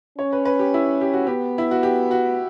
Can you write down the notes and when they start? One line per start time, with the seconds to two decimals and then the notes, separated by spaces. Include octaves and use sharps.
0.18 C#4 C#5
0.33 B4
0.45 B4
0.59 G4
0.74 E4
1.01 G4
1.14 F#4
1.27 B3 G4
1.58 E4
1.71 F#4
1.83 G4
2.11 F#4